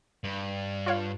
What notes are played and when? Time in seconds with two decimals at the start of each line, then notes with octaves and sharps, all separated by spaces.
0.24 G2
0.86 F4 C#5 F5